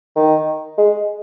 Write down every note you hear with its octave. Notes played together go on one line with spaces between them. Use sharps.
D#3
G#3